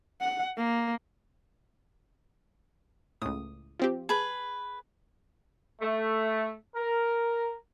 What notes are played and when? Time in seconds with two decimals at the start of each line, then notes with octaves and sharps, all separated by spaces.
0.20 F#5
0.57 A#3
3.22 C#2 A2 D#6
3.80 F3 C4 G4
4.09 G#4 B4 A5
5.81 A3
6.76 A#4